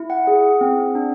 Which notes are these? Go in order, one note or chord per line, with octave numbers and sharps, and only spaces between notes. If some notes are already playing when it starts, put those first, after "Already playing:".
Already playing: E4
F#5
G#4
C4
D4